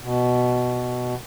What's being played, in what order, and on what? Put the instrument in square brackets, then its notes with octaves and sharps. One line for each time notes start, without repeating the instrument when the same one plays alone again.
[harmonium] B2